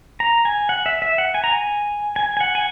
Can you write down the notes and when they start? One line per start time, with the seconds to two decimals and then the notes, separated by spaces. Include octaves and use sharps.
0.20 A#5
0.45 G#5
0.69 F#5
0.86 E5
1.02 E5
1.18 F#5
1.34 G#5
1.44 A#5
1.51 G#5
2.16 G#5
2.37 G#5
2.40 F#5
2.55 G#5